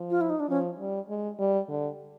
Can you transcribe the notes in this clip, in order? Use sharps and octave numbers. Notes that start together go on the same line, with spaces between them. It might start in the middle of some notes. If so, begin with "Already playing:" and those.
Already playing: F3
F4
E4
D#4
D4
F3 C#4
G3
G#3
G3
D3